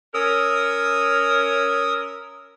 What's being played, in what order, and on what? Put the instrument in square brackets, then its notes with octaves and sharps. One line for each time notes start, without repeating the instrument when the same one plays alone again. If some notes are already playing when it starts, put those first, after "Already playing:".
[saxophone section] C#4 A#4 [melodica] D#6 E6